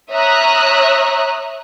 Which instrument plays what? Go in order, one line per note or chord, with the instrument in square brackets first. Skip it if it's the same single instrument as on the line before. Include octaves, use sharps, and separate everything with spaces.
[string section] C#5 E5 A#5 D#6 F6 F#6